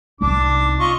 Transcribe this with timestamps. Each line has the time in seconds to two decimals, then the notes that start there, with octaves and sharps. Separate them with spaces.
0.21 C2 D4 D#4 D6
0.79 F4 D#5 C#6